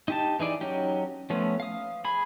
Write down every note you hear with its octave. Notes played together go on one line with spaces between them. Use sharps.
D#4 G4 A5
E3 D#4 G#4 D5
F#3 C#4 D#4 G4
F3 A3 B3 C#4
F5 D#6
G#4 B5